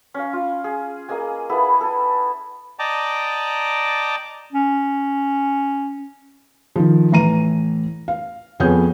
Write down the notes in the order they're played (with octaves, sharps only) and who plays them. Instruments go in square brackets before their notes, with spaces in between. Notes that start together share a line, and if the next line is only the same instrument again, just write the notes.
[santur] C#4 F5
F4
G#4
A#3 G#4 D#5 G#5
B3 E4 G#4 A4
A4 G#5
[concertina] D5 D#5 G5 A5 A#5 D6
[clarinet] C#4
[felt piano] D#3 F3
A2 E3 A#5 D#7
F5
F2 B3 G#4 C#5 G#5 G6